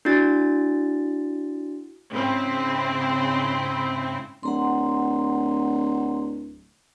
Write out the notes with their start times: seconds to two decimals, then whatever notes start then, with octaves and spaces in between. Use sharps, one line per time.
0.05 D4 E4 F#4 A6
2.11 G#2 C#3 C4 E4
4.43 D1 F#5 A#5 C6